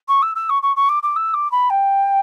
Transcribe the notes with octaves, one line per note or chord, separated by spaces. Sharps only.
C#6
E6
E6
C#6
C#6
C#6
D6
D6
E6
D6
B5
G5